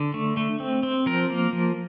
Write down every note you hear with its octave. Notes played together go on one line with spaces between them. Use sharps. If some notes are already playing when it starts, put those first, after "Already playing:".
Already playing: D3
A3
A3
C4
C4
F3 A#4
A#3
F3